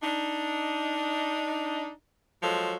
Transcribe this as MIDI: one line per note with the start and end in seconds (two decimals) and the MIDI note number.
0.03 1.90 62
0.03 1.90 63
2.43 2.77 53
2.43 2.77 54
2.43 2.77 56
2.43 2.77 69
2.43 2.77 73